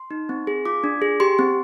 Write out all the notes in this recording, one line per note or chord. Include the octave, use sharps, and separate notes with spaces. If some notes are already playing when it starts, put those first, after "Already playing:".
Already playing: C6
D#4
C4
G#4
F4 D6
D4
G#4
G4 C6
C4